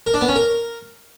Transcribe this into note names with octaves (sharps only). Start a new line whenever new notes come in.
A#4
D4
B3
C#4
A#4